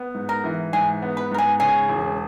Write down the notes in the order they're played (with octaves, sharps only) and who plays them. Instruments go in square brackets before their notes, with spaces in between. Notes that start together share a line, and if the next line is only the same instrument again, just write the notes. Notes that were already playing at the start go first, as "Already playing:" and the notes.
Already playing: [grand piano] B3
G#2
[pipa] A#4
[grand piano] E3
[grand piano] G#2 [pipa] G#4
[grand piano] B3
[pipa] B4
[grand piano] G#2 [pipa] A#4
[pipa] G#4
[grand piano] C#3 [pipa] G#4
[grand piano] E1